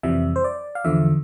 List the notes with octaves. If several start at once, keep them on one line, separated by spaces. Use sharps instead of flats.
F2 C3 E3 G3 E5
C5
D5
F5
E2 D3 F3 E5